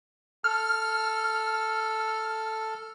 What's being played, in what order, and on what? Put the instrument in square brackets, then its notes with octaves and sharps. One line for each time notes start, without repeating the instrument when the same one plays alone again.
[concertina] A4 [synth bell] F6